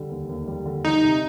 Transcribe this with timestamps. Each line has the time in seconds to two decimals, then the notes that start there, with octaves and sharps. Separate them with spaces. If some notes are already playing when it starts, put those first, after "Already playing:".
Already playing: D3 G3
0.10 D#2
0.29 D#2
0.48 G3
0.66 D3
0.84 G3 D#4
1.04 C3